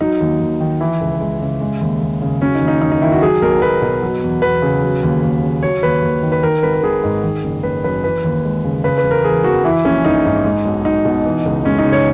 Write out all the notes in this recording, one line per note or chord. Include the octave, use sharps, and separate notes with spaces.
F#3 D#4
D#2
D#2
D#3
E3 E4
C#2
G#3
C#3
G#3
D#2
D#2
C#3
F#3 C#4
D#4
D#2
D#4
D#2 D#4
D#4
D#3 E4
F#4
F#3 G#4
B1 A#4
B1 B4
B2
F#3
E2
E2 B4
C#3
F#3
D#2
D#2
C#3
F#3 C#5
D#2 B4
D#2
D#3
B4
D#3 A#4
G#1 B4
A#4
G#1 G#4
G#2
D#3
F#1
F#1 B4
F#2 B4
E3 B4
D#2
G#3
C#3
C#3 B4
B4
E1
A#4
E3 G#4
E2 F#4
E3 E4
A#1 C#4
A#1 D#4
G#2
G#3
B1
B1 D#4
B2
E3
C#2
G#3 C#4
D#4
C#3
C#5